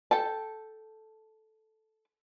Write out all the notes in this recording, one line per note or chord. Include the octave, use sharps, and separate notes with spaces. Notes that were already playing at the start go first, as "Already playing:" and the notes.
A4 G5 A5